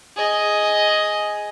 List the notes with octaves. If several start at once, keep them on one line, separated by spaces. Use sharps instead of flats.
G#4 D#5